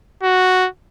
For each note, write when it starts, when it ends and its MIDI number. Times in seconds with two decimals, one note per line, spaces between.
0.23 0.68 66